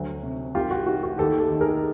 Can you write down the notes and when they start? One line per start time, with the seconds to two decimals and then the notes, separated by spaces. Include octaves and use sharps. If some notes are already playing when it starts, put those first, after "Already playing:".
Already playing: D2 F#3
0.23 C3
0.55 C2 F4 G4
0.71 F#4
0.86 C2 F#4
1.03 F#4
1.18 D#2 G4 A4
1.39 G4 A4
1.50 D#3
1.61 G#4 A#4